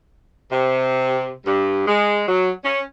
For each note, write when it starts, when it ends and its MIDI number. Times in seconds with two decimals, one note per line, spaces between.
0.50 1.31 48
1.46 1.84 43
1.86 2.23 56
2.27 2.50 54
2.64 2.81 61